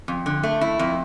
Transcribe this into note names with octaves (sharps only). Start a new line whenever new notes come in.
F2
D3
A3
E4
F2